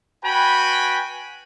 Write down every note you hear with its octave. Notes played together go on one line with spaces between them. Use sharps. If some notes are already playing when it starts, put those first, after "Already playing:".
F#4 B4 G5 G#5 B5